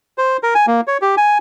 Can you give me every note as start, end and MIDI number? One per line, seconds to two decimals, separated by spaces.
0.18 0.37 72
0.43 0.54 70
0.55 0.66 80
0.67 0.81 58
0.87 0.98 73
1.02 1.15 67
1.17 1.38 80